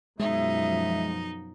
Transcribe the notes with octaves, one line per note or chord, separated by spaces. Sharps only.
F#2 B2 F3 G#3 D#4 E5